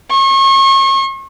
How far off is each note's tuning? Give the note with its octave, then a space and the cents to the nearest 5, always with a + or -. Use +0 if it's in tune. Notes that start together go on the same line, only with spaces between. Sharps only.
C#6 -40